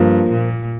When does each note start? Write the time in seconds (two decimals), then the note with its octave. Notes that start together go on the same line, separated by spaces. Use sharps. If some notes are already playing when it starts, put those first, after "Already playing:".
Already playing: G2 F3 A#3
0.30 A#2